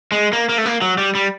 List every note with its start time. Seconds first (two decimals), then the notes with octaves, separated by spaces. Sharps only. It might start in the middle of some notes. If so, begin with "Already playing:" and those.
0.12 G#3
0.33 A#3
0.49 A#3
0.58 A3
0.66 A#3
0.82 F#3
0.98 G3
1.15 G3